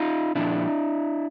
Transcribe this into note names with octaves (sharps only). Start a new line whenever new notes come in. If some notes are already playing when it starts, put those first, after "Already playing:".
Already playing: D#4 F4
A#2 F3 D4 E4